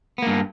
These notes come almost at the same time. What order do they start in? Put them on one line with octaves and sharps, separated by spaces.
B3 A#3 G2